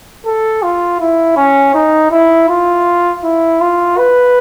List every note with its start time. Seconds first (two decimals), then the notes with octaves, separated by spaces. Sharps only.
0.26 A4
0.63 F4
1.00 E4
1.37 C#4
1.74 D#4
2.12 E4
2.49 F4
3.24 E4
3.61 F4
3.97 B4